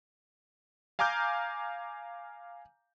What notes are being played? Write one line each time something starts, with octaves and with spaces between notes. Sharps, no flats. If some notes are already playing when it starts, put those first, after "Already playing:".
F5 G#5 A#5 D6 F6 G6